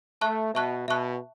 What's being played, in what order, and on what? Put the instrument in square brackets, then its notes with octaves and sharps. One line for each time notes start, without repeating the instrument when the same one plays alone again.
[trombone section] A3 [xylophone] E5 A5 C#6 F#6
[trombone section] B2 [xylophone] E5 A5 C#6 F#6
[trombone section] B2 [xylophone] E5 A5 C#6 F#6